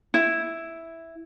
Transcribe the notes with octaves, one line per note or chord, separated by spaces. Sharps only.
E4